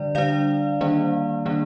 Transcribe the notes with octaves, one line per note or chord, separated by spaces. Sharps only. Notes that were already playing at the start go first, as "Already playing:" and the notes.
Already playing: D3 G3 D4 D5
D3 G3 D4 D5 F5
D#3 G3 A#3 D4
D#3 G3 A#3 D4